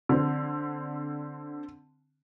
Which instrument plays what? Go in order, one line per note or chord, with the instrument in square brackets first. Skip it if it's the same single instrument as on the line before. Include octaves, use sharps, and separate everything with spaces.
[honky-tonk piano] D3 C4